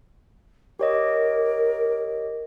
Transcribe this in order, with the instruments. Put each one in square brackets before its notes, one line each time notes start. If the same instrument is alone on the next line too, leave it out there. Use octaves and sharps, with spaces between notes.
[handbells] G4 C#5 D#5 [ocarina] A#4